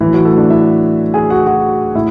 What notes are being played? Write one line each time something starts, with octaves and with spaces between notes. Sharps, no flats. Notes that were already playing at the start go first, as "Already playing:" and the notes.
A2 E3 F#3 E4
F#3 F#4
A3 A4
D4 D5
E4 E5
G#4 G#5
F#4 F#5
F#4 F#5
A2 E4 E5